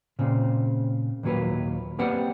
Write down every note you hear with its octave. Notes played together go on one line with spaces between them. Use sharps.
A#2 C#3 C4
D#2 A#2 F#3 A#3 B4
A#3 C4 G4 B4 D5 F#5